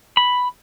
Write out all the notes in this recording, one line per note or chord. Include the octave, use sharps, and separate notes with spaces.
B5